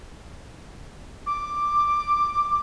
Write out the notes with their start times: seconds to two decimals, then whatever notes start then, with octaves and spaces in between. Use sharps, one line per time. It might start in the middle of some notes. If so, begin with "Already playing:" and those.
1.26 D6